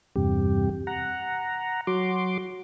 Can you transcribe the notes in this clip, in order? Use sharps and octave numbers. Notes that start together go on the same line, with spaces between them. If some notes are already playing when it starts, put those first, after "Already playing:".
E2 G2 C3 G4
F#5 A#5
F#3 F#4 C6 D6